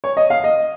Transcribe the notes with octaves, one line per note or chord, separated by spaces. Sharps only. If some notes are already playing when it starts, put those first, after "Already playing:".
C#5
D#5
F5
D#5